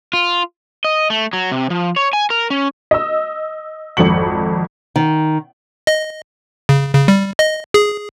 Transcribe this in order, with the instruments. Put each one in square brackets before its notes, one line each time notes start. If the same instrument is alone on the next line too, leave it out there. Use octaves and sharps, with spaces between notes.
[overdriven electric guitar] F4
[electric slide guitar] D#5
A3
F#3
C3
F3
C#5
G#5
A#4
C#4
[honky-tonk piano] D#5 E6
G#1 F2 A4 C#7 F#7
[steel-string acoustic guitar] D#3
[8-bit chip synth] D#5
C#3
C#3
G3
D#5
G#4